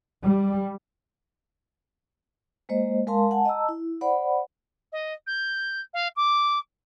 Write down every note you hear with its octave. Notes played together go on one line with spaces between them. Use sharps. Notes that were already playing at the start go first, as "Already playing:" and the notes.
G3
G#3 A#3 C5 D#5
G#3 A#4 F5 A5 C6
F#5 G#5 A5
D#5 A5 A#5 E6
E4
C5 D5 F#5 B5
D#5
G6
F5
D6